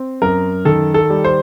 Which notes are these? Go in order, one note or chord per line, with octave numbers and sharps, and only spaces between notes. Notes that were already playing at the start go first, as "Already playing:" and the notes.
Already playing: C4
F#2 A#4
D#3 A4
A4
G3
C5